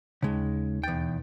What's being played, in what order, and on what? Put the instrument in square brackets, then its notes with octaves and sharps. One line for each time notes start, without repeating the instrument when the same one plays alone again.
[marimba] D#2 [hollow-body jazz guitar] C#3 G#3
[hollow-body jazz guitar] E2 G5 [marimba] B2 A6